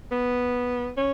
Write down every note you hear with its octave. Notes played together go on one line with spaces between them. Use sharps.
B3
C#4